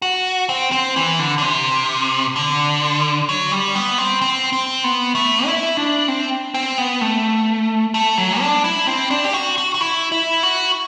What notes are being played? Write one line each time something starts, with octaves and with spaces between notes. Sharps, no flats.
F#4
C4
C4
E3
D3
D3
C3
D3
F#3
G3
B3
C4
C4
C4
B3
A3
E4
D4
C4
C4
B3
A3
A3
F#3
D4
E4
C4
D4
G4
F#4
F#4
F#4
E4
E4
F#4